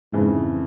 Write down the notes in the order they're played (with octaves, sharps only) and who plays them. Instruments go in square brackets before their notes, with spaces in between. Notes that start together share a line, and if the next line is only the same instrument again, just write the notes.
[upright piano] F2 C#3 E3 [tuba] G#2